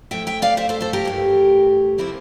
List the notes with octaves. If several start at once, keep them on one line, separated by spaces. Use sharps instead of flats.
A2 F3 A3 E5 G5
E5 G5
D5 F5
C5 E5
A4 C5
A4 C5
G4 A#4
G2 E3 A3
C3 F3 A#3 C4 E4